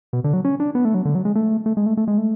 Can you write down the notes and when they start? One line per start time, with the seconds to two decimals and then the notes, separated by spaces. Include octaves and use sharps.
0.13 B2
0.24 D3
0.33 F#3
0.45 C#4
0.60 D4
0.75 B3
0.85 A3
0.94 F#3
1.05 D3
1.15 F#3
1.25 G#3
1.35 A3
1.66 A3
1.77 G#3
1.86 A3
1.97 A3
2.08 G#3
2.18 A3